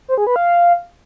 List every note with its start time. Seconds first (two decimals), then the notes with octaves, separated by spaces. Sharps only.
0.08 C5
0.18 G#4
0.27 B4
0.36 F5